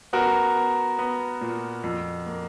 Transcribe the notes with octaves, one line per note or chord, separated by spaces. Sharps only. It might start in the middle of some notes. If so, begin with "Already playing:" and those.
B3 F#4 A#4
B3
B3
A#2
F2
A#3